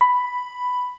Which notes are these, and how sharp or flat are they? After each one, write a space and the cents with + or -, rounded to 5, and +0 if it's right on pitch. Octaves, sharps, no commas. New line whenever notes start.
B5 +5